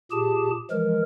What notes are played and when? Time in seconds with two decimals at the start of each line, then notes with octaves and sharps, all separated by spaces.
0.11 A#2 G4 G#4 A5
0.71 E3 F3 G#3 A#4